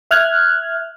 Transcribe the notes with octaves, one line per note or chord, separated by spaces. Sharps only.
E5 F6 F#6 G#6